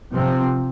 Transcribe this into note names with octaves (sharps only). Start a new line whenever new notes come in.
C3 F3 C4